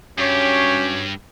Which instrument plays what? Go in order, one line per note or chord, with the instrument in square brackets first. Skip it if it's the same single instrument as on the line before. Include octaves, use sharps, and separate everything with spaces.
[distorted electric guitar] G2 [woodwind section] F#3 F#4 C#5 [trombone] C#4 [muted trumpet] G4